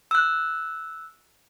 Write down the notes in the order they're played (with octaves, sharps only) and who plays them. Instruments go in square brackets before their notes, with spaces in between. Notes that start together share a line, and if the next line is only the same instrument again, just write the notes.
[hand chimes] E6 F#6